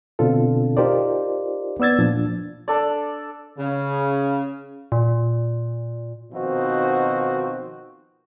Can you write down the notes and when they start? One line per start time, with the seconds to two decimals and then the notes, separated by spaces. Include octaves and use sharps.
0.19 B2 D3 C4 D4 F4 A4
0.77 D#4 F4 G4 A#4 C5 D5
1.80 B3 D5 E6 G#6 A6
1.99 A#2 F3 D4
2.68 D4 A4 D5
3.58 C#3
4.92 A#2
6.32 B2 D#3 F3 C4 D#4 F#4